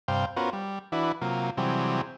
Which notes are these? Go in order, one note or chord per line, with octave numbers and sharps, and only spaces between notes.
G2 C3 C5 F5 G5
B3 C#4 F4 F#4 A#4 C5
G3
E3 D4 E4 F#4 B4
C3 F#3 A#3 F4
C3 E3 F#3 G3 C4 G#4